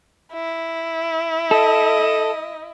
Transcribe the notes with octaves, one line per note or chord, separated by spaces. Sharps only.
E4
A4 D#5